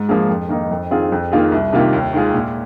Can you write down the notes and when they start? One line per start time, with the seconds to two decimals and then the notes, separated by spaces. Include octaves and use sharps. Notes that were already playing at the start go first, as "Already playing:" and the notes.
Already playing: G#2
0.09 F3 A#3 G#4
0.29 F2
0.49 D#3 A#3 D#4
0.71 F2
0.91 D#3 C4 F4 G#4
1.12 F2
1.32 D#3 A#3 F4 G#4
1.52 C2
1.73 C3 D#3 A#3 F4
1.93 D#2
2.13 D#3 G#3 F4 G#4
2.34 A#2